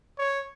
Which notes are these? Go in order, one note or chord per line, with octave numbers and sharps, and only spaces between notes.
C#5